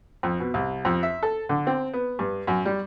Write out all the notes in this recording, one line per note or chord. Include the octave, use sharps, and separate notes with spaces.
F2
B2
C2
F2
E5
A4
D3
C4
B3
G2
F#2
G3